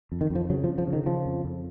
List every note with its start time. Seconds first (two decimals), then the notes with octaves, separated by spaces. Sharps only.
0.12 F2
0.21 D#3
0.30 F2
0.35 F3
0.50 C#3 F#3
0.64 F3
0.69 C#3
0.78 F3
0.87 C#3
0.93 D#3
1.06 C#3 F3
1.26 F2
1.45 F2